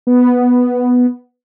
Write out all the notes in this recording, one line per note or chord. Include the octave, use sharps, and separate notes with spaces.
B3